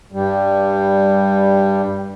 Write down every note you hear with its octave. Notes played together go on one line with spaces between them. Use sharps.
G2 G3